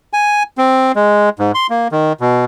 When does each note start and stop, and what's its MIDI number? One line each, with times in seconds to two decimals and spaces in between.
0.13 0.43 80
0.58 0.92 60
0.96 1.29 56
1.39 1.52 44
1.55 1.67 84
1.70 1.88 58
1.92 2.13 51
2.21 2.45 47